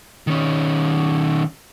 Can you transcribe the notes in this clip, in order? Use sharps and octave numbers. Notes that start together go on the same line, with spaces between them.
D#3 C#4